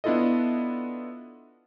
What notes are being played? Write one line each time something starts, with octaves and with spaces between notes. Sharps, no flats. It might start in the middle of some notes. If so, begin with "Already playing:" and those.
B3 D4 E4 F4 A4 D#5